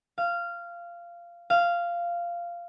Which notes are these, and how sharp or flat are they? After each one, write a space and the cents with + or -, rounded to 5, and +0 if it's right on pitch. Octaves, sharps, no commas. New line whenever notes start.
F5 -15
F5 -10